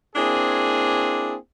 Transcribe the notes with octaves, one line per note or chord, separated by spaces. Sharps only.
A#3 C4 D4 E4 G#4